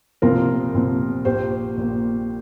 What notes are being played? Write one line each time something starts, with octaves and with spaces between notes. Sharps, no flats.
C2 A#2 F3 F4 A#4
C2 A#2 F3
A#1 A#2 A#3 G4 C5
A#1 A#2 A#3